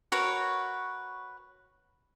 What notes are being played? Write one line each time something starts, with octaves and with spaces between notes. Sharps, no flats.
F#4 A#4 B4 C#5